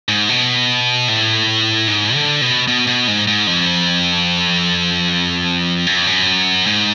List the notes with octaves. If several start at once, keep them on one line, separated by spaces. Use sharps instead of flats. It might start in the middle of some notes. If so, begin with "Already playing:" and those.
G#2
B2
A2
G#2
D3
B2
B2
B2
G#2
G#2
F2
F#2
F2
F#2
G#2